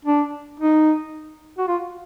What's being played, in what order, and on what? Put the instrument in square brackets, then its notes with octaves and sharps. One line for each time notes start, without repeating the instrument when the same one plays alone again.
[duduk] D4
D#4
F#4
F4